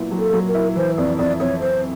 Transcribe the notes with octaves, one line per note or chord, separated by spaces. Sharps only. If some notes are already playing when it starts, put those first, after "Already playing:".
Already playing: A#2 F#3 B3 E4
F#3
A4
F#3
A#4
E4
E3 C5
F2 D5
F2 D5
F2 C#5
F2 C5